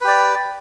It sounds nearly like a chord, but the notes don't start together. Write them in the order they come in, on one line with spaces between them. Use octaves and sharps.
B4 G4 D5